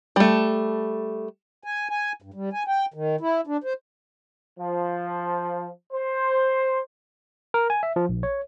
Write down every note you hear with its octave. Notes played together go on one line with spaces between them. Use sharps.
G3 A3
G#5
G#5
G2
G3
G#5
G5
D#3
E4
D4
C5
F3
C5
A#4
G#5
E5
F3
A#1
C#5